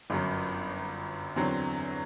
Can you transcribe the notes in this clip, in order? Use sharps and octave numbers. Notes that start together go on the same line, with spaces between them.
G1 F#2 F#3
E2 D3 F#3 C4